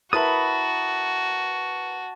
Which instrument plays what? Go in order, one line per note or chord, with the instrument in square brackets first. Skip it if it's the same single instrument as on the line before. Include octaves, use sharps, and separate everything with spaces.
[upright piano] E4 A#4 B4 [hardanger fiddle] F#4 [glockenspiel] A5 A6 [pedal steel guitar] B5 D#6